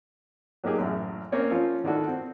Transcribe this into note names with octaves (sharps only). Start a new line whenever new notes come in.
F#3 A#3 D#4 G4 G#4
A1 F#2
A#3 C4 C#4 C#5 D5
F3 C#4 F4
D3 D#3 D4 E4 F#4 A4
C4